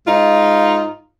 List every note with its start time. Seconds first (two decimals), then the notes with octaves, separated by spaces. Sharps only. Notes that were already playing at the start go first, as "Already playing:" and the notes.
0.07 G#2 D#4 F4